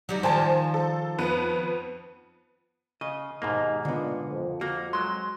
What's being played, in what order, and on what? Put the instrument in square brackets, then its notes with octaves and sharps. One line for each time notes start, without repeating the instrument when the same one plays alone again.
[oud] F#3 G3 D#4
[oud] D#3 F3 D5 [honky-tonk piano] C5 G#5 A5
[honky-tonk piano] A4
F2 B3 B4
[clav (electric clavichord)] C#3 [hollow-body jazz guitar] D#5
[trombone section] D#2 G#3 D#4 [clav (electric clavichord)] G#2 B2 A#3
[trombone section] A#2 [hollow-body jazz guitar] D3 B3
[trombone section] F2
[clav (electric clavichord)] A#3 [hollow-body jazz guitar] F#4
[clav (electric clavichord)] F#3 G#3 [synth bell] C6